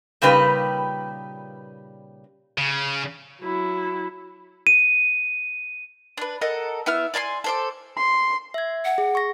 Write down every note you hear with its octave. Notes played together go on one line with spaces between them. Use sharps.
A#2 C#3 G3 D#4 G4 B4
C#3
F#3 E4
D#7
D4 B4
A4 A#4 D#5 F#5
B3 E4 E5 F6
D5 G#5 A#5 C6
A4 C5 D6
C6
E5 G#6
F#5
G#4
C#6 A#6